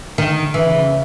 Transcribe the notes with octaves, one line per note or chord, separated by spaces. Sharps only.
D3 D#3
D3
E3
C#3